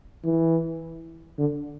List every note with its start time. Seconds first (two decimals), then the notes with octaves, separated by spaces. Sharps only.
0.25 E3
1.38 D3